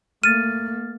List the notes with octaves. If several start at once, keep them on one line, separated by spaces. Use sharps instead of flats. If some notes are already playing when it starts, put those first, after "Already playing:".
A3 A#3 F6 A6 D#7